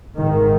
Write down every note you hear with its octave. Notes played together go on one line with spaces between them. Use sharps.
G#1 G#2 D#3